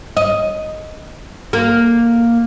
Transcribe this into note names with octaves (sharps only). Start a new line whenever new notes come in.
D#5
A#3